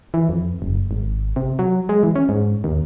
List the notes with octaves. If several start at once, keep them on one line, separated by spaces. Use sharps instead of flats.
E3
F2
F#1
G#1
C3
F#3
G#3
E3
C#4
G#2
D#2